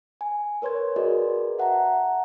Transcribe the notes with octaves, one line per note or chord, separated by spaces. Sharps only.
G#5
A#4 B4 C#5 C6 G#6
F#4 G#4 A#4 B4 D5 D#5
E5 F#5 A5 A#5